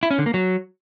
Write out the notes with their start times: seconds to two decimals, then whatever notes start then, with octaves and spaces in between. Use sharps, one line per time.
0.03 E4
0.11 C#4
0.18 D3
0.26 A#3
0.34 F#3